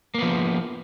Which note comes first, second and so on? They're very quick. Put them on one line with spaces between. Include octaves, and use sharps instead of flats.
A#3 B3 F3